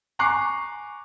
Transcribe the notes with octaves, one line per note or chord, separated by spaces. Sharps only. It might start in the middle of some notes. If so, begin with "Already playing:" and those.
G#5 A#5 C#6 D6 F#6 C7